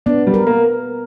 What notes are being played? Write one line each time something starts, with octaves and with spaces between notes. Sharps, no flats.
B3 D4
G3
A#4
A#3